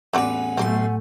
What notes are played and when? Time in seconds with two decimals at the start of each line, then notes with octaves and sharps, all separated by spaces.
0.13 A1 E2 C4 F#4 B4 D5 F#5 G#5
0.57 B1 A2 A3 C4 G4 C6